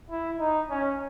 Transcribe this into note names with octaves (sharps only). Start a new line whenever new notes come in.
E4
D#4
C#4